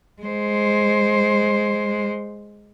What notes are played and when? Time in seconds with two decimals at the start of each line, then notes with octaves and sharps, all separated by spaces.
0.22 G#3 C5